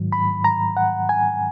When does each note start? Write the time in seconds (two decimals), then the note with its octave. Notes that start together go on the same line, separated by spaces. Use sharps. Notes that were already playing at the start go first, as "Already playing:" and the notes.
Already playing: G#2 D#3 F#3
0.12 B5
0.44 A#5
0.77 F#5
1.09 G#5